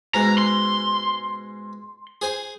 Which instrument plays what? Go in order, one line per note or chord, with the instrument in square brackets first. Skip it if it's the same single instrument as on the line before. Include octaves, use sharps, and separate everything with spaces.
[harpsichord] G#2 B2 G#3 [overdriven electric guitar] A#5
[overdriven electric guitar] C6
[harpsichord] G#4 C5 G#5